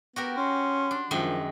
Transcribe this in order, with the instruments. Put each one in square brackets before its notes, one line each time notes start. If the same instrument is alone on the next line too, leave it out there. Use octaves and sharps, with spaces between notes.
[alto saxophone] B3 [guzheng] F#4 G4 A#4
[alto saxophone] C#4 [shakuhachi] C6
[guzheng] D4
[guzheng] F#2 D#3 G#3 [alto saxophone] F3